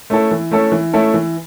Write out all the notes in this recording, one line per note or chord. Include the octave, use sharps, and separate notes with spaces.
A3 C#4 E4 A4
E3
A3 C#4 E4 A4
E3
A3 C#4 E4 A4
E3